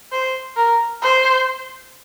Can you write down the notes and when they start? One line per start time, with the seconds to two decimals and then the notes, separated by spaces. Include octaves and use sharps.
0.12 C5
0.57 A#4
1.02 C5